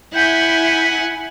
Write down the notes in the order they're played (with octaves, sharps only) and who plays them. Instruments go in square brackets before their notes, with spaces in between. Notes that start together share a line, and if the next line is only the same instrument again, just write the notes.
[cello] E4 [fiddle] F#5 G#5 [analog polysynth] G6 B6